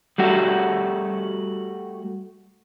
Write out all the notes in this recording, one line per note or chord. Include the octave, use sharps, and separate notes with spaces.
G3 A3 F#4